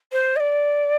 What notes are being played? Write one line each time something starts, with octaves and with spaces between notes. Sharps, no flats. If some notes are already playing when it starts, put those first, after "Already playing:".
C5
D#5
D5